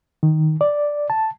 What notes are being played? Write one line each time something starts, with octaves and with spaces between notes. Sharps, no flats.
D#3
D5
A5